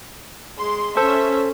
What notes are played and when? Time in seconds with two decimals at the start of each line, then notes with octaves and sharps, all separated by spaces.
0.57 G#3 C6
0.97 C#4 A4 C5 E5